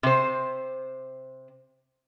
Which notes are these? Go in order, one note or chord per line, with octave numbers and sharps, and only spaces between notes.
C3 C5